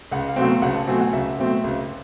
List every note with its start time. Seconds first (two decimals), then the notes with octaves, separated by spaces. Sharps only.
0.11 C#2 F#5
0.28 F5
0.36 B2 F#3 A3 C4 F#5
0.45 F5
0.62 C#2 F#5
0.75 A5
0.87 B2 F#3 A3 C4 G#5
1.00 F#5
1.13 C#2 E5
1.38 B2 F#3 A3 C4
1.64 C#2